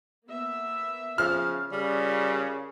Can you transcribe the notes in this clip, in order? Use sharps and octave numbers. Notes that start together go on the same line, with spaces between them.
A#3 B3 E5
C#3 F3 F6
C#3 G3 F4 A#4